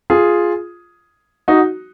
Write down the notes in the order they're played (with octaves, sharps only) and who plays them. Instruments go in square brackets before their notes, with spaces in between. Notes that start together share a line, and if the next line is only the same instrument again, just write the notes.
[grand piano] F4 G#4
D#4 F#4